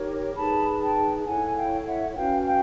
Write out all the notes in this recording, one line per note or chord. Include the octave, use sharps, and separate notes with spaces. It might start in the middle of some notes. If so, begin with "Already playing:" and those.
Already playing: D#4 G4 A#4 C#5
D#4 G#4 B4 A5 B5
G5 A5
E4 A4 C#5 F#5 G#5
G#5
F5 G5
E5 F#5
C#4 F#4 B4 F5 G5
F5 G5